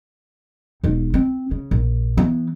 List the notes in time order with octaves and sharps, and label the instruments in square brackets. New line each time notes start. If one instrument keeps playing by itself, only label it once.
[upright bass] E1 D#4
C4
C#3
A#1
E3 B3